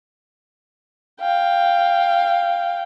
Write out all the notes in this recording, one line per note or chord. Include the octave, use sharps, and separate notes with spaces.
F5 G5